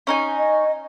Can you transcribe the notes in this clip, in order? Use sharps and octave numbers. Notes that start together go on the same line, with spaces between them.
C#4 D#4 G#5
D#5